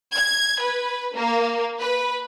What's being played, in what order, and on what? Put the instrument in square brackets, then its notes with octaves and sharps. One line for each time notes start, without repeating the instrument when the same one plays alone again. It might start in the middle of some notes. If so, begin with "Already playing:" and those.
[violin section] G#6
B4
A#3
B4